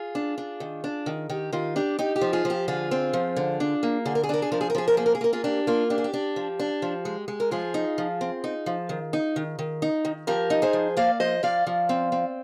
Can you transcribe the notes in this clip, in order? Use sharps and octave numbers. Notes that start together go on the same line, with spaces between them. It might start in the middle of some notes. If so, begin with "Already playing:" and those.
Already playing: F4 G#4
D4
D4
D#3
D4
D#3
D#3 G4
D#3 F4
D4 G4
D#4 G4
G4
F3
F4 G#4
F3 G4
D3 F4 G#4
C4
F3
D3
D4
A#3
D3 G#4
A#4
G#4
D4 A#4
G#4
F3 A#4
G#4
A#4
F3 G#4
A#4
A#3 G#4
A#4
G#4
A#3 A#4
F4 G#4
D4 G4
A#3 F4
D4 G4
G#4
G4
D4
F3
D4
F3
G#3
G#3
A#4
F3 F4 G#4
D#4
F3
C4
D#4
F3
D#3
D#4
D#3
D#3
D#4
D#3
F3 G4 A#4
D#4
G#4 C5
F3
A#3 D5 F5
F3 C5 D#5
F3 D5 F5
F3
C4
C4